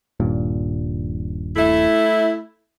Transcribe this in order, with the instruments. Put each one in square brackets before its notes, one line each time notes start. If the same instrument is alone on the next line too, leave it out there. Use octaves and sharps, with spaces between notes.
[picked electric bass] D#1 G2 A#2
[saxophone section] A3 E4